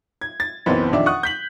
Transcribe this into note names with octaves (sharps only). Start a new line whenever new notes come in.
G#6
A6
F#1 B1 E3 B3 C4
F2 D#3 D4 D5 E5
F#5 C#6 D#6 F#6
G6 B6 F#7